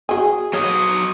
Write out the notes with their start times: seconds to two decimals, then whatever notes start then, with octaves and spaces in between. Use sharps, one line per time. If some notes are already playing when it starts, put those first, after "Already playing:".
0.09 F#4 G#4 G#5
0.53 F#3 C#5 D#5 F5